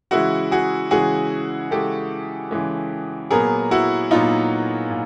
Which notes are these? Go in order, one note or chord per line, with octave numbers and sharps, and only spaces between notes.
C#3 E3 G#3 E4 F#4
F#4 G#4
C#3 E3 G#3 F#4 G#4
C#3 E3 G#3 G4 A4
C#3 E3 G#3
A#2 F#3 B3 G#4 A#4
E4 F#4
A#2 F#3 B3 D#4 F4
A#2